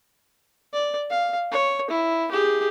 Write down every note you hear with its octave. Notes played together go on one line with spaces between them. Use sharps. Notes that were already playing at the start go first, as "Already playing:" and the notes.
D5
F5
C#5
E4
G4 G#4